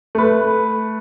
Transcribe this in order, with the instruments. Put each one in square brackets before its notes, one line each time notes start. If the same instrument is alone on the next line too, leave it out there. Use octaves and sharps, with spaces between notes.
[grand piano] A3 B4